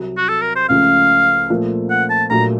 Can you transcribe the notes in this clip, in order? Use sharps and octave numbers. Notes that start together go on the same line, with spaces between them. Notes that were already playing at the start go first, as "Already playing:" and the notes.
Already playing: C2 C3 F#3
F#4
A4
A#4
C5
C#2 C#3 F3 A3 F5
A#2 F3 A3
F#5
A5
A#1 A#2 F#3 A3 A#5